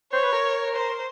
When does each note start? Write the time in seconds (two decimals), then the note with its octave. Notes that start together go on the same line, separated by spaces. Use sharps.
0.13 C5 C#5
0.23 B4
0.33 A#4
0.74 C5